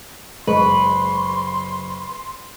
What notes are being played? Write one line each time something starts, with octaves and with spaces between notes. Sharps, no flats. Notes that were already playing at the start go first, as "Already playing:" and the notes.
F#1 G#3 B4 C6 C#6